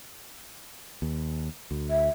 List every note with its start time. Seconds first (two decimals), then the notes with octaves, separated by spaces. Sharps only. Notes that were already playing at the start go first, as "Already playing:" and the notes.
1.02 D#2
1.71 D2
1.90 E5